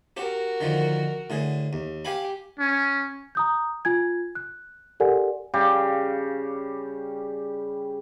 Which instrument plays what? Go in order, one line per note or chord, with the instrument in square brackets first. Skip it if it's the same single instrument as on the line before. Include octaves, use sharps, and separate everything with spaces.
[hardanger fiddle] F#4 A#4 [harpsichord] G4
[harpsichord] D3 D#3 F3
A2 D3 G#4
D#2
[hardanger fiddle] G4 [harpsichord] F5 G#5 B5
[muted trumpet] C#4
[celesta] A#5 D#6 G6
F4 G#5 G#6
F#6
G4 A4 A#4 D5 F#5 G#5
[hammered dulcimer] C#3 G3 G4